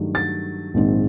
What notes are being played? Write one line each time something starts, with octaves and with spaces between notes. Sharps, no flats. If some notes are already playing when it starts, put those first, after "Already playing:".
Already playing: G2 D#3 F#3 A3
A6
A#1 G#2 D#3 G#3 C4